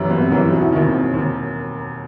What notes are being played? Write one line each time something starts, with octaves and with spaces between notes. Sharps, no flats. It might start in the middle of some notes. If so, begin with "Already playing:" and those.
Already playing: G1 F#2 E3 G3 F#4
G1 B3
C4
F#2 E3 G3 D#4
E4
E1 F#4
D#4
E4
D#2 D#3 D#4
C4
E1 C4
D#2 D#3